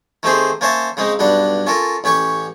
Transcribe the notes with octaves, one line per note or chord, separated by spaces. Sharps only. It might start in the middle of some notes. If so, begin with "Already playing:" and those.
D#3 A3 C4 G4 G#4 C5
A#3 C#4 C5 C#5 E5 A5
C#3 G#3 C4 D#4
B1 G2 G3 D4 F#5
C#4 F4 A4 A#4
A1 C#4 G4 C#5 C#6